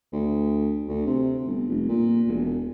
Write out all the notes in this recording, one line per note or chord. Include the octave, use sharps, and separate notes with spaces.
D2
D2
C3
G1
F1
A#2
E1